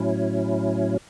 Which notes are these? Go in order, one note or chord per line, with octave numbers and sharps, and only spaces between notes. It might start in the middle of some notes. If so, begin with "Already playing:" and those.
Already playing: A2 F#3 C#4 E4